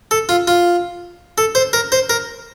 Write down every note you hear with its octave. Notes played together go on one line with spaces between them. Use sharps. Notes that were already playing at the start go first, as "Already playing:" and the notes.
A4
F4
F4
A4
C5
A#4
C5
A#4